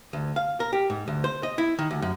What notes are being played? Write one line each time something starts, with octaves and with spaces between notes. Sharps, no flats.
D2
F5
A#4
G4
G#2
D2
C5
D#5
E4
D#3
D2
F#2